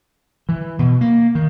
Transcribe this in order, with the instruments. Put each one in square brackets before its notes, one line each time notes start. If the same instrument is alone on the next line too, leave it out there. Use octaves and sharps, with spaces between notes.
[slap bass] E3
B2
A#3
D#3